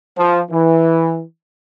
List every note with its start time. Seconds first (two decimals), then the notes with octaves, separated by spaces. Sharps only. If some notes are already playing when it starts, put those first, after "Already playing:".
0.17 F3
0.50 E3